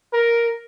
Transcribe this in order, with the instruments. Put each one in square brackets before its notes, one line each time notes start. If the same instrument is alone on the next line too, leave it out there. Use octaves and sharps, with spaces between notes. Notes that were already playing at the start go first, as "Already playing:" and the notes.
[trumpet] A#4